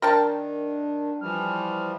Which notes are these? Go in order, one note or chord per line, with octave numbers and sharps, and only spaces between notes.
D#3 D4 A#4 G5 A5
E3 F3 G3 F6